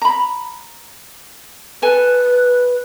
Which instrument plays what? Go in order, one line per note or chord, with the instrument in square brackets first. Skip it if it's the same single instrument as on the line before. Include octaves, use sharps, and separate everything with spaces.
[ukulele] A#5 B5
[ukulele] A4 G#5 [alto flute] B4